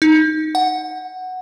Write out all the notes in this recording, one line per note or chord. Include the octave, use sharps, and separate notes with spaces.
D#4
F#5